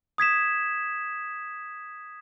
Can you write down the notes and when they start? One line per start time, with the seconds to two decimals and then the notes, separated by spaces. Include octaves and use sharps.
0.18 D#6 G#6 B6 E7